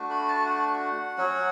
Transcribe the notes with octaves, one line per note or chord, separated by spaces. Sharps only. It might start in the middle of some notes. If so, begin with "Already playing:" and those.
Already playing: A3 D4 F#4
B5
A5
F#5
F#3 C#4 F#4